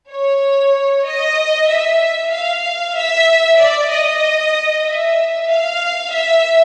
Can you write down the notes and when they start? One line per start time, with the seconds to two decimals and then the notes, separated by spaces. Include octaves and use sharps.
0.10 C#5
1.05 D#5
1.68 E5
2.31 F5
2.96 E5
3.58 D5
3.90 D#5
4.85 E5
5.49 F5
6.12 E5